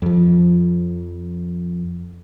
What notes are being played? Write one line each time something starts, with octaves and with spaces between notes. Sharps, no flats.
F2 F3